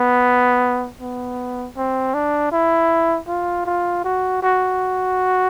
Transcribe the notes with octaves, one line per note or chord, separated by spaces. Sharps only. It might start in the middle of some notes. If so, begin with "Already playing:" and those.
Already playing: B3
B3
C4
D4
E4
F4
F4
F#4
F#4